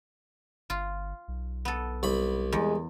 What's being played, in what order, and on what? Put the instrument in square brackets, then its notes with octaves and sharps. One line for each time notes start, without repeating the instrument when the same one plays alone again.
[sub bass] G1 [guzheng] F4
[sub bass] B1
[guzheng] B3 A4
[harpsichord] C2 B5
[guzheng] E2 [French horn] G#3